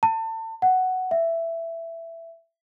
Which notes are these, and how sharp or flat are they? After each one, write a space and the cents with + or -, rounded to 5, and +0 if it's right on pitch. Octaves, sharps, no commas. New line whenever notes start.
A5 +30
F#5 +5
E5 +10